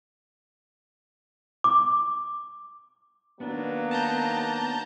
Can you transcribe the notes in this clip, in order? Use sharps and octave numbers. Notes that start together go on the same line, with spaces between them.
D6
D#3 F#3 A#3 B3 D4
A5 A#5 G6